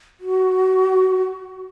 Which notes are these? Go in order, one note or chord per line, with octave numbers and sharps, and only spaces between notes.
F#4